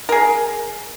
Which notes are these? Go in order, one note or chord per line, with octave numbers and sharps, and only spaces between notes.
G#4 A#4